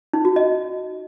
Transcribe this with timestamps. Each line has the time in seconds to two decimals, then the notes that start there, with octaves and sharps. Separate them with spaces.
0.13 D#4
0.25 F#4
0.36 D#5